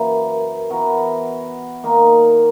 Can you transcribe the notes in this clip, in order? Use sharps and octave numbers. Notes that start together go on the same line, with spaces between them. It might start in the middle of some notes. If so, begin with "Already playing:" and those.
Already playing: F#2 E3 A#3
E3 B3 F#4 A#4
D#3 A#3 D#4